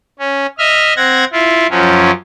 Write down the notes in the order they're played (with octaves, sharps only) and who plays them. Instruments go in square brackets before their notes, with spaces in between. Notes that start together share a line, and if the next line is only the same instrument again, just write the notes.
[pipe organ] C#4
D#5 E5 F6
C4 F#5 G#6 A#6
E4 F4
F#2 F3 F#3 C#4